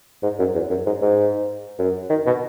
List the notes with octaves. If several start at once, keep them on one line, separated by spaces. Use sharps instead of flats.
G#2
F#2
E2
F#2
G#2
G#2
F#2
D#3
B2